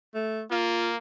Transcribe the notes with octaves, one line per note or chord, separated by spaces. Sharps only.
A3
A#3 F4